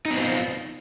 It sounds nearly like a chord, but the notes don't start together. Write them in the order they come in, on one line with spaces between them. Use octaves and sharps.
D#4 B3 C4 F4